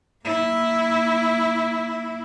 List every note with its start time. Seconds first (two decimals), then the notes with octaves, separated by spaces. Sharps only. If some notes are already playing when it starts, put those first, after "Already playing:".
0.25 A#3 E4